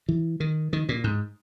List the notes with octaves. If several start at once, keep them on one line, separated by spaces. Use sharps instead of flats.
E3
D#3
D#3
A#2
G#2